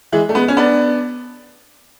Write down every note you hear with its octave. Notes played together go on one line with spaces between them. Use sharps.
E3 G#3
A3
G#3 B3
C#4
B3 D4